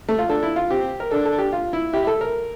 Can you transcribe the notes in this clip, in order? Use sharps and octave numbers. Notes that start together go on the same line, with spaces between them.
A3
F4
D4 A4
E4
F4
C4 G4
A#4
D4 A4
A4
G4
F4
E4
E4 G4
A4
A#4